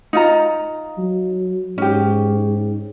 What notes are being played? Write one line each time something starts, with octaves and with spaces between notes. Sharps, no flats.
D#4 F4 A#5
F#3
G#2 C#4 G4